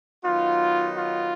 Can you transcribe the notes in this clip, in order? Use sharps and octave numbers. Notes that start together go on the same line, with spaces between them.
D#3 F#3 B3 D#4 F4
F4